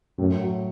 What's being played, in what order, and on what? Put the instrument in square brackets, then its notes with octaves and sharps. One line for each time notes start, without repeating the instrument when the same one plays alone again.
[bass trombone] F#2 [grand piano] A2
[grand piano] F#3